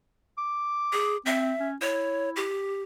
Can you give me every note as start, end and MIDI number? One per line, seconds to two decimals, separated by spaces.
0.38 1.16 86
0.93 1.17 68
1.26 1.53 60
1.26 1.68 76
1.60 1.75 61
1.81 2.48 64
1.81 2.30 73
2.36 2.83 67